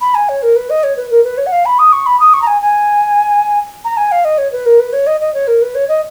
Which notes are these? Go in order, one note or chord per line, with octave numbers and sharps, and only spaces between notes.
B5
G#5
C#5
A#4
B4
D#5
C#5
B4
A#4
B4
C#5
F#5
F5
B5
D#6
C#6
B5
D#6
C#6
A#5
G#5
G#5
A#5
G#5
F5
D#5
C#5
B4
A#4
B4
C#5
D#5
D#5
C#5
A#4
B4
C#5
D#5